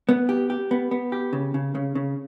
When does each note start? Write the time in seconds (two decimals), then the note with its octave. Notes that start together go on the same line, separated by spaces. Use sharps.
0.09 B3
0.29 G4
0.50 G4
0.71 B3
0.91 B3
1.12 G4
1.33 C#3
1.54 C#3
1.75 C#3
1.95 C#3